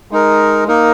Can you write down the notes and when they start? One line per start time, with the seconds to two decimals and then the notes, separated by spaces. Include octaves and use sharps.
0.11 G#3 D#4 A#4
0.68 A#3 D#4 A#4